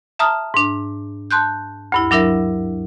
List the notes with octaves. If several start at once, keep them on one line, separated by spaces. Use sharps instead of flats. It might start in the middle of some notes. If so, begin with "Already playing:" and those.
E5 A5 A#5 D#6 F6
G#2 D4
A5 C6 F#6 G6
D2 G2 E4
F#3 D4 E4 A#4 E5